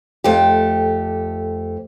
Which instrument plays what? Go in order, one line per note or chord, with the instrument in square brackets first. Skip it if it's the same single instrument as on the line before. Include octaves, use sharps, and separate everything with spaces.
[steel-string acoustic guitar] F2 A3 G4